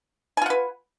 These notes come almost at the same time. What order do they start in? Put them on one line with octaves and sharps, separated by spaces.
G#5 F4 F#5 B4